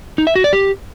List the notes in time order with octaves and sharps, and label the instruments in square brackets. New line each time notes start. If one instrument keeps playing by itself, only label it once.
[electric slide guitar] D#4
E5
F#4
D5
G4